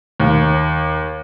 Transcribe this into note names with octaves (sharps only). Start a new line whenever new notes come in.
D#2